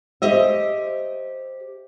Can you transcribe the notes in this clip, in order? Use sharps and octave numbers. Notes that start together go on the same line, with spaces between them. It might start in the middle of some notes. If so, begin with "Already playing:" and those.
G4 C5 D#5 E5